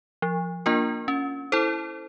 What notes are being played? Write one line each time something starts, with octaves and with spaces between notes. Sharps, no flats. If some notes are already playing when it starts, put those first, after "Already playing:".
F3
A#3 D4 F4 A#4
C#4
E4 A4 C5